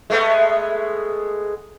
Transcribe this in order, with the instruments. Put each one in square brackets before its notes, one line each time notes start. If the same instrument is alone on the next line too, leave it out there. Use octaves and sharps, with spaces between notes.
[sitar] G#3 A3 B3